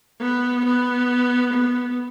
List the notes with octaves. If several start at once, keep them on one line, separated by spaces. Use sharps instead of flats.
B3
B3
B3